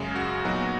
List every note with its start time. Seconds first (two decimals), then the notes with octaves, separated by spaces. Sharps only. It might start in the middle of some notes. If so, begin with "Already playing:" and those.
Already playing: F#2 C#3 G#3 G#4
0.16 F#4
0.45 A#2 F#3 B3 D#4